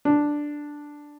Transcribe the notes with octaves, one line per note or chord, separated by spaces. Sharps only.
D4